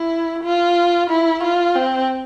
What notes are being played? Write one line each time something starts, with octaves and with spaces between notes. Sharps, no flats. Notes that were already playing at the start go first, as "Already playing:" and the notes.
Already playing: E4
F4
E4
F4
C4